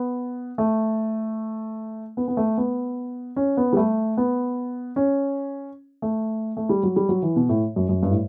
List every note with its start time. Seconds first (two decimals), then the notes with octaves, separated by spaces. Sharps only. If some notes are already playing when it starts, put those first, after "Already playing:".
Already playing: B3
0.58 A3
2.17 B3
2.28 B3
2.37 A3
2.58 B3
3.36 C#4
3.57 B3
3.73 G3
3.77 A3
4.17 B3
4.96 C#4
6.02 A3
6.57 A3
6.69 G3
6.83 F#3
6.96 G3
7.09 F#3
7.22 E3
7.36 B2
7.49 A2
7.76 F#2
7.89 F#2
8.03 G2
8.10 A2